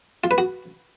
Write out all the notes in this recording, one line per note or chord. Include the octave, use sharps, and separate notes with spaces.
F4
B4
F#4